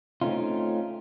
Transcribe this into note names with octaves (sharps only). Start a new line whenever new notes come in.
A3 C4 C#4 D#4 F4